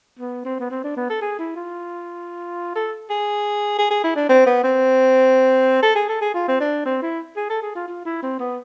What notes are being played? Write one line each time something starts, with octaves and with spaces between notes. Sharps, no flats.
B3
C4
B3
C4
D4
B3
A4
G#4
E4
F4
A4
G#4
G#4
G#4
E4
D4
C4
B3
C4
A4
G#4
A4
G#4
F4
C4
D4
C4
E4
G#4
A4
G#4
F4
F4
E4
C4
B3